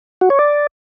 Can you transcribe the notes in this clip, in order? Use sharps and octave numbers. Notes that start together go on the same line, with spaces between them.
F#4
C#5
D5